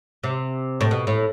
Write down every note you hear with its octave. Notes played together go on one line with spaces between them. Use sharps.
C3
A2
B2
A2